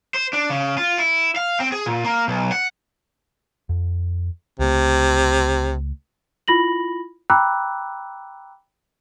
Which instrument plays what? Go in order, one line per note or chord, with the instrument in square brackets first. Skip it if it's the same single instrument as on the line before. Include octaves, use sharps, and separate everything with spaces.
[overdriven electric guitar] C5
D4
C#3
F4
E4
F5
C4
G#4
A#2
A#3
B1
F#5
[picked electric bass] F2
[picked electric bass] C#2 A3 [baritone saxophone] C3
[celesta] E4 F4 B5 A#6 F#7
G5 A#5 B5 D6 E6 F#6